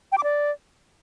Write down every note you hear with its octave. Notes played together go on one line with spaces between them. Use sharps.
G5
D6
D5